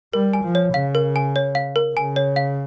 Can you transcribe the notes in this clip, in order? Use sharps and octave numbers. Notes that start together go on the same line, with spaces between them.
G3 A#4
G#5
F3
C#5
C#3 F5
A#4
G#5
C#5
F5
A#4
C#3 G#5
C#5
F5